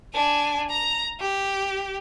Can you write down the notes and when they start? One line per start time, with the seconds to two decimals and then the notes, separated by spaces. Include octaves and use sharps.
0.14 D4 G#5
0.69 A#5
1.20 G4